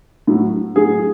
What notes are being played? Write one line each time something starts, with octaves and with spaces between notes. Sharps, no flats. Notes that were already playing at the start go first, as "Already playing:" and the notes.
A2 F#3
A2 F#3 G#4